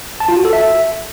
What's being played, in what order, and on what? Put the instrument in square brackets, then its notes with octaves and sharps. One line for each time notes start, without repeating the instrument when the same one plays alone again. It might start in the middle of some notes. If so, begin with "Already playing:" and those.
[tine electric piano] A5
F4
F#4
A4
E5